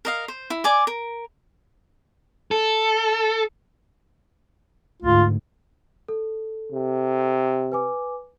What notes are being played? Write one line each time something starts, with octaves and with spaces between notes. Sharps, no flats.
A#4 D#5 F5
C5
E4
D5 G#5 D6
A#4
A4
D2 G#2 F4
A4
C3
B4 G#5 D6